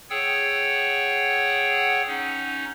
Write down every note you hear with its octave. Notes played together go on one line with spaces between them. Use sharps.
G#4 C#5 F#5 G5 E6
C#4 D#4